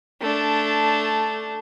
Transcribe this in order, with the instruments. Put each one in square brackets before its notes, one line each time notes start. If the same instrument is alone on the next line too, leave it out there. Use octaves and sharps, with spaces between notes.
[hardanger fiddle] A3 D4